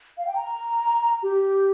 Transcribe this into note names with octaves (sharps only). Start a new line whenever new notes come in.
F5
G5
A#5
G4